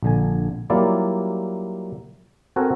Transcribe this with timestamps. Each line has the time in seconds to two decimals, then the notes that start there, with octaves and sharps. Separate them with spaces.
0.03 A#1 D3 G#5
0.70 F#3 G3 A#3 E4 F4 D5
2.56 C4 F#4 A4 A#4 F#5 G#5